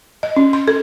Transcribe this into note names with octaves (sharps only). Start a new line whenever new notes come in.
D#5
C#4
C6
A4